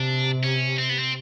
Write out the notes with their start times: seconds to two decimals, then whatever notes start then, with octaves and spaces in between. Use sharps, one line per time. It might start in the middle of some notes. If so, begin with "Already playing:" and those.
Already playing: C3 D4
0.43 C#4
0.78 C4
0.89 B3
0.99 C4